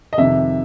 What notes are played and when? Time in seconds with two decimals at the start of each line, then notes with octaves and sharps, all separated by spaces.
0.13 D#5
0.18 F2 C3 D#3 E5